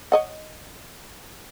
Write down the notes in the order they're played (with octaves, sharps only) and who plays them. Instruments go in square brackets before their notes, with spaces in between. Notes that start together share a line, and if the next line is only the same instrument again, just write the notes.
[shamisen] C#5 D#5 F#5